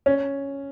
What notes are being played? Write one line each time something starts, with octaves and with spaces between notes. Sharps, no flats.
C#4